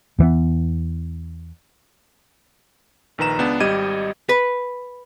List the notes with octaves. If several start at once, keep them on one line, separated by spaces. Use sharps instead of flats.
E2 E3 F3 B3
A#1 D#3 B4 A#5 E7
C#2 B3 D4 E7
G#1 G3 G4 D#5 G#6 D#7
B4